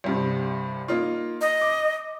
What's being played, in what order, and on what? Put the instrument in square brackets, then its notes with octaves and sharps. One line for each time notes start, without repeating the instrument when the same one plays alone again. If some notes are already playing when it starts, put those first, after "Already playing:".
[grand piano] C2 G2 C3
A#3 D#4 F4
[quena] D#5
[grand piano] D6